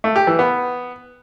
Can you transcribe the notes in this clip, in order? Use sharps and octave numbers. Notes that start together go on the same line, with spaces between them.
A3
G4
E3
B3